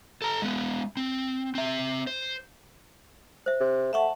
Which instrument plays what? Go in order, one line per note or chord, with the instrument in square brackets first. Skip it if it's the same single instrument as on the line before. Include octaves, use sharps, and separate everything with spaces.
[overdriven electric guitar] A4 A#5
G#3 B3
C4
C4 E5
C5
[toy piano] C5 E5
[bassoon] C3
[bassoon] A3 [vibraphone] E5 F#5 A5 [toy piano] B5 C#6